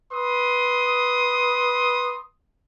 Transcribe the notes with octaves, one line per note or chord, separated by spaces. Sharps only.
B4 C6 D#6